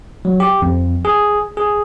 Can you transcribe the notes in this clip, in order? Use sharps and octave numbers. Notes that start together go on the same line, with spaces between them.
F#3
G4
F2
G#4
G#4